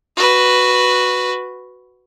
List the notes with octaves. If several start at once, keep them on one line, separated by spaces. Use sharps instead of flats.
F#4 B4